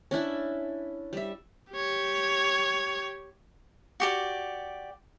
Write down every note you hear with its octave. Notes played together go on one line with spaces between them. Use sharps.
C#4 D4 E4
G3 E5
G4 C#5
F#4 G4 D5